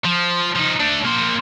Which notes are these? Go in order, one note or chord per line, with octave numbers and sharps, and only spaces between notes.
F3
F3 D#4
A3 D4
A#3 C5